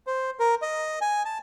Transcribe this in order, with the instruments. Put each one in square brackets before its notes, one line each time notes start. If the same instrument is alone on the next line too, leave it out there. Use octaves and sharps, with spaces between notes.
[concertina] C5
A#4
D#5
G#5
A5